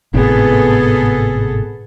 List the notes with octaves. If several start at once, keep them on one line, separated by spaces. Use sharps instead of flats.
G#1 A2 C3 B3 G#4 A4